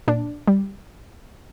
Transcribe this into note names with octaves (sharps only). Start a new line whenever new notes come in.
A#2 D4
G3